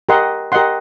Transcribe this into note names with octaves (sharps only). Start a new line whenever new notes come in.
G4 A#4 D#5 F#5 C6
G4 A#4 D#5 F#5 C6